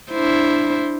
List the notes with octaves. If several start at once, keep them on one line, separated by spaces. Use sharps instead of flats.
D4 E4 C5